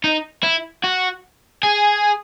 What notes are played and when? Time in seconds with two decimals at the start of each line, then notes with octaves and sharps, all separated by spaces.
0.04 D#4
0.43 E4
0.84 F#4
1.63 G#4